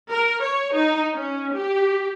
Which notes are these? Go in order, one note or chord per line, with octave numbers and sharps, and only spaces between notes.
A#4
C#5
D#4
C#4
G4